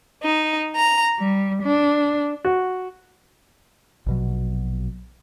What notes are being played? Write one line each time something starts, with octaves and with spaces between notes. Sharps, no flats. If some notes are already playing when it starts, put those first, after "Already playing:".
D#4
A#5
G3
D4
F#4
A#1 B2 F#3